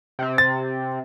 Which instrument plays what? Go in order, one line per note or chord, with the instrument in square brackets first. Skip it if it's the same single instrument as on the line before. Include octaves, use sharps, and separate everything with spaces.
[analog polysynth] C3 C4
[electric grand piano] A6